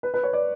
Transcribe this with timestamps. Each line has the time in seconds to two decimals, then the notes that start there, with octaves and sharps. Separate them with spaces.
0.03 B4
0.14 B4
0.23 C#5
0.33 D5